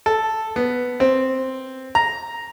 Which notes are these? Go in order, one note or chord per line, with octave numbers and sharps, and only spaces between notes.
A4
B3
C4
A#5